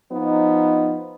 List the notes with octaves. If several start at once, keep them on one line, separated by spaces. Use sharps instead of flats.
F3 B3 D#4